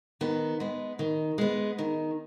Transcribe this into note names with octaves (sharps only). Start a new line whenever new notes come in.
D#3 B3
G#3 B3
D#3
G#3 B3
D#3